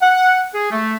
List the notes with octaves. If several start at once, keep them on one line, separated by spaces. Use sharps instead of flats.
F#5
G#4
A3